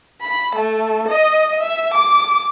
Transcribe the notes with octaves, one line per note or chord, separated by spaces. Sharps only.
B5
A3
D#5
E5
D6